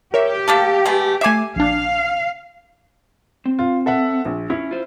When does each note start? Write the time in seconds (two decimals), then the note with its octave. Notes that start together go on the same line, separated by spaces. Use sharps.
0.14 G4 A#4 C#5 E5
0.48 A3 A#3 A4
0.86 G#3 A3 B3
1.21 A3 E5 G#5 D6 C7
1.56 A#1 D4 F5
3.46 C4
3.59 F4
3.86 A4 E5 F#5
4.25 A#1
4.50 C#4 E4
4.71 F4 C5